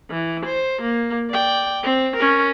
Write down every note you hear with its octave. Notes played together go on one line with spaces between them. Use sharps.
E3
C5
A#3
D5 G5
C4
C#4 A#4